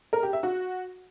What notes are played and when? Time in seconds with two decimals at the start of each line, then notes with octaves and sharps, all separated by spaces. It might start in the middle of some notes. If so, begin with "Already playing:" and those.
0.13 A#4
0.23 G4
0.33 E5
0.43 F#4